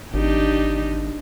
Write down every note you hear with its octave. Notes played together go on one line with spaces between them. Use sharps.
G#1 D4 D#4 G4